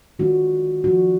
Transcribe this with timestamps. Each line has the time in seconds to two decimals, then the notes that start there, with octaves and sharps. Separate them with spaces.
0.19 D#3 G#3 D4 F4 F#4
0.84 F3 A#3 D4 F4 F#4